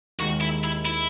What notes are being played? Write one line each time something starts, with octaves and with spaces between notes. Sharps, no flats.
D#2 D#3 G#3 F#4
E4
E4
E4